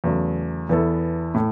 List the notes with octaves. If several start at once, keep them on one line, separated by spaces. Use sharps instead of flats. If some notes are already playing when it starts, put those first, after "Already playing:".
E2 C#3 F#3 A3
E2 E3 B3 E4 A4
A2 A3